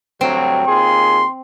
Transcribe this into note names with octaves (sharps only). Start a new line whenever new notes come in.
D2 G2 F#3 C4
D#2 F4 G#4 C6